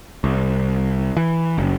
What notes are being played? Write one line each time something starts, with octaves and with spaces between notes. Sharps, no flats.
C2
E3
F#1